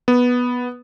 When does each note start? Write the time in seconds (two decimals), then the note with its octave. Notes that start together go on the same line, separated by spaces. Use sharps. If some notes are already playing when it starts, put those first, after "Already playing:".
0.08 B3